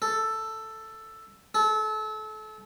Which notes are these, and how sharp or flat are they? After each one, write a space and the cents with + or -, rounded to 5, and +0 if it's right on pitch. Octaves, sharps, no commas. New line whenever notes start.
A4 +5
A4 -30